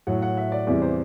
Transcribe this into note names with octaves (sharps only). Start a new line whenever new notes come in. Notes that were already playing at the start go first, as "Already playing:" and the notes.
A2 F#3 F#5
F#5
E5
D5
E2 C3 E3 G3 D5
C5